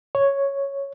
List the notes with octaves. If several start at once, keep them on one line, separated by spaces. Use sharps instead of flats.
C#5